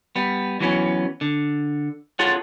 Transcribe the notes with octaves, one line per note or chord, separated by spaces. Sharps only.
G3 B3
E3 F#3 B3 C#4
D3
F4 G#4 A4 C#5 F#5